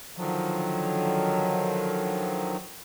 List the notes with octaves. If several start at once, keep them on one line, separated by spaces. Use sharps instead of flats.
D3 D#3 F3 F#3